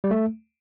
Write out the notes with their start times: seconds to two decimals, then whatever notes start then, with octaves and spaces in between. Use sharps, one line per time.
0.04 G3
0.11 A3